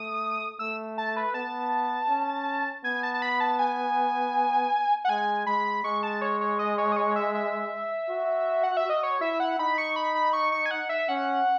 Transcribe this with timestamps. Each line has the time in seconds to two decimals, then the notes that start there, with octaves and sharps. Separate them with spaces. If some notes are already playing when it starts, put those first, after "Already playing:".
Already playing: A3 D#6
0.59 A3 E6
0.98 A5
1.17 B4
1.34 B3 A5
2.09 C#4
2.84 B3 G#5
3.03 A5
3.14 A5
3.22 B5
3.40 A5
3.59 G#5
5.05 F#5
5.09 G#3 G#5
5.47 G#3 B5
5.84 G#3 C#6
6.03 A5
6.21 C#5
6.41 C#5
6.59 D#5
6.78 C#5
6.92 D#5
6.96 C#5
7.16 E5
7.34 E5
8.09 F#4
8.64 F#5
8.77 E5
8.84 F#4
8.89 D#5
9.03 C#5
9.21 E4 E5
9.40 F#5
9.59 D#4 B5
9.78 C#6
9.96 B5
10.15 B5
10.33 C#6
10.52 C#6
10.66 G#5
10.71 F#5
10.89 E5
11.08 C#4 F#5